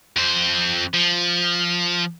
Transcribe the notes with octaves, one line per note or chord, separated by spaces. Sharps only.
F2 C5
F3